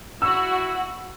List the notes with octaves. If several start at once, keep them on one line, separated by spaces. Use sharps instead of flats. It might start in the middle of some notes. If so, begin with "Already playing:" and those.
E4 F#4 E6